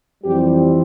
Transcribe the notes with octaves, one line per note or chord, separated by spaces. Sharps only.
F2 E3 G3 C4 G4